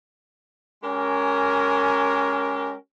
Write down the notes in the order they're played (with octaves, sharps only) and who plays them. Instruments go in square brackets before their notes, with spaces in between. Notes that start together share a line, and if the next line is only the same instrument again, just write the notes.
[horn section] G#3 C#4 G4 A#4